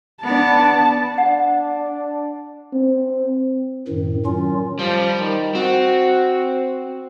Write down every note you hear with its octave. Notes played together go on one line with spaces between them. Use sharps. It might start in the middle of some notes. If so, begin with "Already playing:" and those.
B3 D4 A5
D4 F#5
C4
F#2 A2 D#3
D#3 F#3 C#4 F4
F3 G3
D#3
C4 F#4